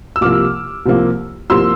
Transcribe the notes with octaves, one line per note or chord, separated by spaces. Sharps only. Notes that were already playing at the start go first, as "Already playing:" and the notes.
E6
C2 C3 F3 A#3 D6 F6
C2 C3 F3 A#3
C2 C3 F3 A#3 C6 E6